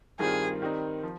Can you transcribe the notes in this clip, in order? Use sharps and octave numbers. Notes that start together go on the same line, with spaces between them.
G2 D#3 G3 C4 F4 G#4
D#3 G3 C4 D#4
F3